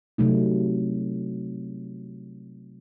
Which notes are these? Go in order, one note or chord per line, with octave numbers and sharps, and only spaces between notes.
C3 F#3 A3 D#4